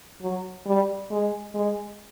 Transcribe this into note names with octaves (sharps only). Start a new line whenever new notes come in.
F#3
G3
G#3
G#3